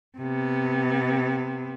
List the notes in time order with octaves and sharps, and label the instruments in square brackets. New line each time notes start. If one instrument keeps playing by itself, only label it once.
[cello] C3 B3